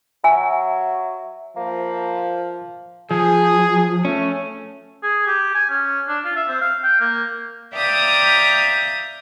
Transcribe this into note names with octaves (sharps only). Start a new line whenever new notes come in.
F#3 E5 G#5
F3 A#3
F3 G#4
A3 C#4
G#4
G4
G#5
C#4
D4
F4
E5
C4
F5
G5
A#3
D5 E5 F5 G5 A#5 D#6